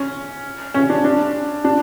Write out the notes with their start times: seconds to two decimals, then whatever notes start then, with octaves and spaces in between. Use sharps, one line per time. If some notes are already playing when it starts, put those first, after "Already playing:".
Already playing: C#4
0.74 C#4
0.90 D4
1.04 D4
1.64 D4